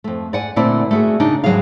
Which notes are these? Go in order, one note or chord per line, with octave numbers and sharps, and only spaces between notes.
F2 A3
D5 F#5 G#5
A#2 D3 A3 C4 E4 D5
A3 F#4 G#4
C#3 D4 D#4
D#2 G#2 F#3 G3 G#4 F5